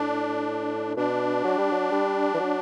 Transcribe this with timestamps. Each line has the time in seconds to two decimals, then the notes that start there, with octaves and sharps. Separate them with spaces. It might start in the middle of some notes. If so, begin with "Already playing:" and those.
Already playing: A2 D4
0.97 B2 D4
1.44 F#3
1.58 G3
1.71 F#3
1.92 G3
2.34 E3
2.39 F#3